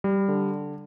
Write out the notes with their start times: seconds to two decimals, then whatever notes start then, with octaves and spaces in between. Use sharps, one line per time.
0.04 G3
0.28 D3